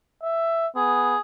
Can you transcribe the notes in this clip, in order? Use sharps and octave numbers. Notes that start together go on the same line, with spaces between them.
E5
B3 G#4